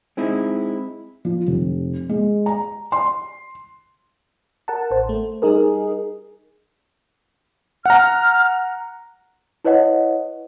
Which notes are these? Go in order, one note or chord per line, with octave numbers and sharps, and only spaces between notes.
G#3 C4 D#4 E4
F3
F1
G#3
A#5
C6
A#4 F#5 A5
A1 C5
A3
G3 D#4 G#4 A#4
F#5 A#5 F6
E4 B4 C#5 D#5 F#5